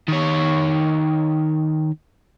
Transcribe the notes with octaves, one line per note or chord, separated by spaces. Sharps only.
D#3 C#5